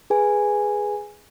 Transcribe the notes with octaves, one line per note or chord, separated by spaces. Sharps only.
G#4 B4 G#5